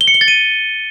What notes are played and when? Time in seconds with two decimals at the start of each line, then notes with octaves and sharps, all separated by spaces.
0.01 G7
0.08 C#7
0.14 G7
0.21 A6
0.28 D#7